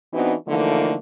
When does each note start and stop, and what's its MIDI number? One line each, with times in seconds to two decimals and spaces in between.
0.13 0.34 52
0.13 0.34 59
0.13 0.34 60
0.13 0.34 62
0.13 0.34 63
0.13 0.34 66
0.47 0.96 50
0.47 0.96 52
0.47 0.96 53
0.47 0.96 57
0.47 0.96 58
0.47 0.96 63